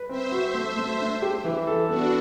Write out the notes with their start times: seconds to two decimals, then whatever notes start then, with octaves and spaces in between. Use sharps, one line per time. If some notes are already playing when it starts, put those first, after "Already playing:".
Already playing: B4
0.09 C4 C5 E5
0.32 F#4
0.54 A3
0.77 A3
1.00 D4
1.22 G4
1.44 E3
1.67 A4
1.89 B3 D4 F#4